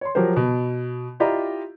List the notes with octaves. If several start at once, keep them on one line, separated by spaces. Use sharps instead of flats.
C#5 C6
F3 F#3 G4 A#4 C5
B2
E4 F4 G4 D5 D#5 A#5